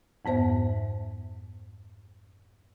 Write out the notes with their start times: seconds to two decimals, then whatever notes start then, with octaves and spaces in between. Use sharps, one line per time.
0.25 F2 G#2 B3 C5 E5